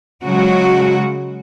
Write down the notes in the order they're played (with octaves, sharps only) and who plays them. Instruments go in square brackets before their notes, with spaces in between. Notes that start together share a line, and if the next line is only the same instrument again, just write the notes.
[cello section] C#3 F#3 G#3 F#4